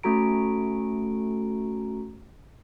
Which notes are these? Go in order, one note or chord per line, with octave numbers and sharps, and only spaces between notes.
A3 C#4 F#4 A4 A#5 D7